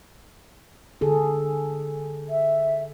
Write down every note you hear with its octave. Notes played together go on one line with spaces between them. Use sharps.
D3 G#4 A4
E5